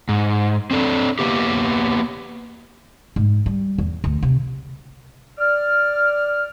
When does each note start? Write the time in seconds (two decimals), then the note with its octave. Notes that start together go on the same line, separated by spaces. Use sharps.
0.09 G#2
0.71 C4 D4 A4
1.19 A#3 B3 G4
3.16 G#2
3.46 G3
3.78 E2
4.04 D2
4.23 C3
5.39 D5 F6